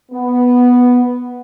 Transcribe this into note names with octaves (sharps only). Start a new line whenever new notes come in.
B3